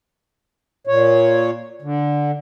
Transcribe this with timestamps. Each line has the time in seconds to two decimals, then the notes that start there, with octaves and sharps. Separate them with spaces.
0.87 A#2 C#5
1.82 D3